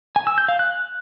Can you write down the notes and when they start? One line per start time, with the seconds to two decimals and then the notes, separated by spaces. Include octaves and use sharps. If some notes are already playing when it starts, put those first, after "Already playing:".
0.16 G#5
0.27 E6
0.38 G6
0.48 F5
0.59 F#6